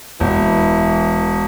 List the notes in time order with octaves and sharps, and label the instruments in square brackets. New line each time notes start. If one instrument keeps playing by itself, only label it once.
[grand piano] E1 [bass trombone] E3